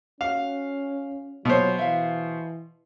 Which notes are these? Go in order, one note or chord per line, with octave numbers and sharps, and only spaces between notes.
C#4 F#4 F5
B2 F#3 F4 A4 C5 C#5
E3 E5 F5